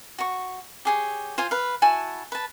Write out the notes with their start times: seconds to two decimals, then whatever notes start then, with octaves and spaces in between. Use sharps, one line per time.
0.19 F#4 C#6
0.85 G4 G#4 C#5
1.38 F4 C5 G#5
1.51 B4 F5
1.82 E4 F#4 G#5 A5
2.32 B4 A5